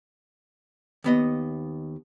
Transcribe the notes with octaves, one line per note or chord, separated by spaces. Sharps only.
D#2 B3 D#5